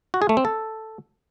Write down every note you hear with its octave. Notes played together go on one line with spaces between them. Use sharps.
F#4
G#4
A3
C4
A4